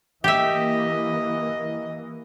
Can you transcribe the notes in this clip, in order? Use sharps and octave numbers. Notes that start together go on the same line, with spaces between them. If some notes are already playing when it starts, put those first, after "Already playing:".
E3 A#3 G4 D#5 E5